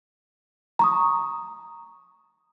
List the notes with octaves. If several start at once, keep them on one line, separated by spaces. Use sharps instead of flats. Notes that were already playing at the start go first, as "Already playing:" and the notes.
A#5 C#6 D#6